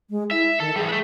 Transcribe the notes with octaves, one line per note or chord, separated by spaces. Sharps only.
G#3
E4 E5
D#3 A4
E3 G3 G#4
A3 B4